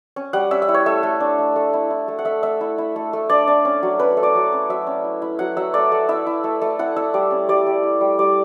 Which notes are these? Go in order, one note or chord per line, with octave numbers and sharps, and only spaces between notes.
C#4
G3 F#5
C#4 E5
E5
E4
C#5
A3 E5
A3
D4
A3
A3
E4
E4
A3
F#5
A3 E5
A3 E5
E4
E4
A3
A3
D4 D5
D4
C#4
F#3
C#4 B4
A3
D5
F#3
C#4
F#3 E5
C#4
E4
E4
F#3 F#5
F#3 E5
A3 D5
A3
E4 E5
E4
A3
A3
E4 F#5
E4 E5
G3 D5
C#4
G3 D5
G3
E4
G3
G3 D5